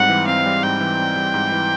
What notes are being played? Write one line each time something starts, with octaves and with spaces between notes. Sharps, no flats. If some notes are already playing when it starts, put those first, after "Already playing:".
Already playing: G#2 G3 C4 F#5
E3
C4 F5
G3
G#2 G5
E3
C4
G3
G#2
E3